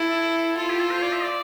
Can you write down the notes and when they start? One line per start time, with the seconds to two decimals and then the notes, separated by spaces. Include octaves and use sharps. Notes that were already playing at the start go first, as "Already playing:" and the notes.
Already playing: E4 A4
0.58 F4 A4
0.69 G4
0.80 A4
0.91 C5
1.02 D5
1.13 E5
1.24 D5